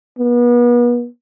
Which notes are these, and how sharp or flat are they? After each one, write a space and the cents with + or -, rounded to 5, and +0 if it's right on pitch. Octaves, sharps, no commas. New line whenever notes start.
B3 -35